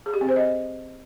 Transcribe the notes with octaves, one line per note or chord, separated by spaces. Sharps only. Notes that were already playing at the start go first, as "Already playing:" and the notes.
G#4
G4
C4
C5
D#5